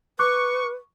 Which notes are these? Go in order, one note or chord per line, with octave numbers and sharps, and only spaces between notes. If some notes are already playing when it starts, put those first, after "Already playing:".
B4 C#6 D6 F#6